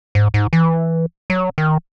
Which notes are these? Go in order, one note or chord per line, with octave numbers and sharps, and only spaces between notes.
G#2
G#2
E3
F#3
D#3